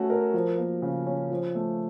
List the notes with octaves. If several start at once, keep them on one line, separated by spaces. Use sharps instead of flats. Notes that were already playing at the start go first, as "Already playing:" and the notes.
Already playing: A3 C#4 F#4
A#4
F3
A#3
C#3
C#4
F3
A3